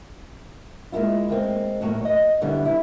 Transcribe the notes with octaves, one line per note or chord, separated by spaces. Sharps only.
G#3 A#3 B3 E4 F4
G#3 A#3 C4
D#2 A2 F#3 G#3 A#3
C#5 D#5
F#2 D3 G3 B3 E4
E4